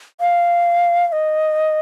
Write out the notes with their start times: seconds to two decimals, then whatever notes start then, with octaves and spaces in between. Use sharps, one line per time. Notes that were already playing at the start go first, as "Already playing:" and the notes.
0.21 F5
1.08 F5
1.12 D#5